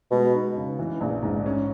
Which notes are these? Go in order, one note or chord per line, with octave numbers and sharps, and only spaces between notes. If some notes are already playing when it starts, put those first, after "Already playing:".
B2 G#3
D#4
C#3
E3
A#1
G#2
C#4